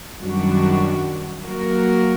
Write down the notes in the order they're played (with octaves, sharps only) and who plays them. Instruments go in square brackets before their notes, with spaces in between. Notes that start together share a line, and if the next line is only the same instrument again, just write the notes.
[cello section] F#2 D#3 G3 D4 F#4
F#3 A#3 F#4 A#4